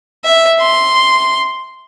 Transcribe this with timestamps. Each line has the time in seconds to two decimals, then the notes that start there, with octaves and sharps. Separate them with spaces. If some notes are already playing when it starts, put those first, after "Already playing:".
0.25 E5
0.60 C6